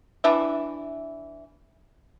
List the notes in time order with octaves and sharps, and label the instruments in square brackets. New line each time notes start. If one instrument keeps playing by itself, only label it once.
[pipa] E3 D4 E5